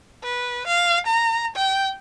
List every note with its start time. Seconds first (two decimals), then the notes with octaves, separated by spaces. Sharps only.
0.23 B4
0.67 F5
1.06 A#5
1.56 G5